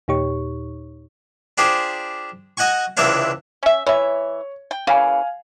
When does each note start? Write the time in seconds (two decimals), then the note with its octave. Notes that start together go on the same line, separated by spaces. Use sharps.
0.08 D#2 A#2 D#4 G4 C#5 C#6
1.58 D4 F4 G4 G#4 C5
2.57 F#4 D#5 F#5 G#5 C#6
2.97 C#2 C3 E3 D4 C#5 F5
3.63 C#4 E5
3.87 E3 C#5 E5
4.71 G5
4.87 C#3 E3 A#3 F5 G#5